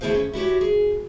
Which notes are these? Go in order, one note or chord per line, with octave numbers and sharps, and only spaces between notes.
D2 A3 E4 G#4 C5 F5
C#4
E4 F#4 G4 C#5
G#4